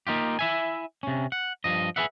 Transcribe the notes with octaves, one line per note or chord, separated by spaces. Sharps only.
A#3 D#4 F4 G4
E4 E5 G#5
C3 C#4
F#5
G2 F3 D#5
G#4 A4 B4 E5 F#5